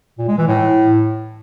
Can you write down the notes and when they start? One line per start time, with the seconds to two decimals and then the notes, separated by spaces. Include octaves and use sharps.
0.18 A#2
0.28 G#3
0.38 E3
0.48 A2